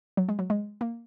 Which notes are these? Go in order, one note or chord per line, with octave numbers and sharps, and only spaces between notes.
F#3
G#3
F#3
G#3
A#3